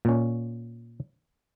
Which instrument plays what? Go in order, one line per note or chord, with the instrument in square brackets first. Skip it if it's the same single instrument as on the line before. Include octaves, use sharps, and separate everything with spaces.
[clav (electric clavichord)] A#2 C#4